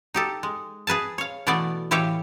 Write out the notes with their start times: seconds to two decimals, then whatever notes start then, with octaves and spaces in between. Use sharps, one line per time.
0.14 D#4 G4 A4
0.43 G#3
0.87 G#4 B4 G#5 A5
1.18 C#5 F5
1.47 B2 E3 A3 B3 D5
1.91 A2 E3 G4 C#5 E5 F5